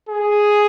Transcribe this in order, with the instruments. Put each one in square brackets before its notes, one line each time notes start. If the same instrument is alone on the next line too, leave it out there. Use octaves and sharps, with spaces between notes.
[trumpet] G#4